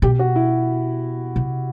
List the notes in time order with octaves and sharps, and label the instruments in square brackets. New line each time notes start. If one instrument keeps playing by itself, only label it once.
[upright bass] B2 [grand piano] G4
[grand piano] F#4
E4
[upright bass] C3